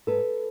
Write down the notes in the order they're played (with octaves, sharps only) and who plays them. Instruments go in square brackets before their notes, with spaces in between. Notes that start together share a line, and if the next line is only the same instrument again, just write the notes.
[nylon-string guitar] G#2 A4 B4